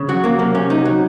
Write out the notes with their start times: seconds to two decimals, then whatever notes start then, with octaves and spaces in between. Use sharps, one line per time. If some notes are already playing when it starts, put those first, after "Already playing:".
Already playing: C#3
0.09 F#3 F#4
0.24 F#3 A#3
0.39 C3 A#3
0.55 C3 C#4
0.70 F#3 D#4
0.85 F#3